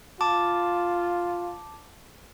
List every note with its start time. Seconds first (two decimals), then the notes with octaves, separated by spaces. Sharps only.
0.21 F4 A5 D6